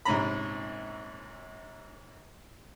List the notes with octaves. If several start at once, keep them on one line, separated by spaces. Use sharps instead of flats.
A#1 G#2 C3 C#4 A#5 B5